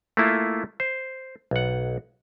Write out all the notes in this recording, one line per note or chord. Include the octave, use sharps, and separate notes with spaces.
A3 A#3 E4 F4
C5
B1 F#5